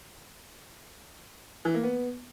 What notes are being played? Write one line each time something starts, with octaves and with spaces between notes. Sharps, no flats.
E3
A#3
B3